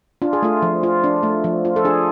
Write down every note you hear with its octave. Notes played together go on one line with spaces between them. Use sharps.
D4 F4
G#4
A3 F4
F3
F4
D4
A3
F3
F4
A4
D4 G#4